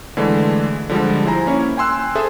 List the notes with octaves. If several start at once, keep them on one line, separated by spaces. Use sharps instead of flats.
D3 E3 G#3 A3
D3 F3 G3 G#3
E4 C5 G#5 A#5
A#3 C#4 E4 C#5
G5 G#5 C6 E6 F#6
G#4 A4 C5 E5